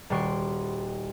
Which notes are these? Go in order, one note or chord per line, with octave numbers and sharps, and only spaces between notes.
D#1 G3 F#4 C6 C#6 D7